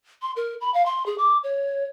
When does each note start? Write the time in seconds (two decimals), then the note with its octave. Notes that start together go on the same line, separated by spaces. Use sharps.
0.22 C6
0.36 A#4
0.61 B5
0.74 F5
0.86 C6
1.06 G#4
1.18 D6
1.44 C#5